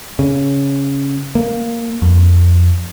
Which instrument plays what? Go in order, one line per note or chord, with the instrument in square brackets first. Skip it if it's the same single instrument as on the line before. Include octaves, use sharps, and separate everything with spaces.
[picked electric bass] C#3
A#3
F2